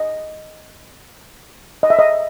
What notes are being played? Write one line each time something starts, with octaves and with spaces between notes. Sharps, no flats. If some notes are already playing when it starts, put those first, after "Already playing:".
Already playing: D#5
D#5
E5
D#5